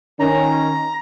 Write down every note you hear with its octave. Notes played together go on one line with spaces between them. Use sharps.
D#3 C#4 A#5